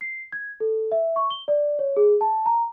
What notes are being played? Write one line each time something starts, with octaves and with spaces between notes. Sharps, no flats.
C7
G#6
A4
E5
C#6
G7
D5
C#5
G#4
A5
A#5